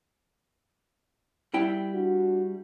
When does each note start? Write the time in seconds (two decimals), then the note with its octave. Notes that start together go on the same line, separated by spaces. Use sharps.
1.54 G3 E4 G5
1.94 D4 F#4